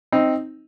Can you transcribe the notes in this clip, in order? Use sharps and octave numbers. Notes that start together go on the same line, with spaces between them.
C4 D#4